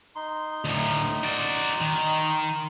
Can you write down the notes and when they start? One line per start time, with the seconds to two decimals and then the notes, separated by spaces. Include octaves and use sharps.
0.16 D#4 C6
0.65 D2 A2
1.24 F#4 D5
1.81 D#3